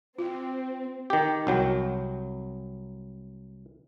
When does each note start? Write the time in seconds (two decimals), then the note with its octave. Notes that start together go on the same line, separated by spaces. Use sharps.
0.19 C4 F4
1.10 D#3 G4
1.47 C2 F#3 G5